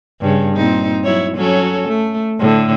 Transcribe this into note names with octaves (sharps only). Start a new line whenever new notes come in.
G2 C#3
A#2 C4 D#4
F#3 E4 C#5
F#3 C#4 A4
A3
A2 D3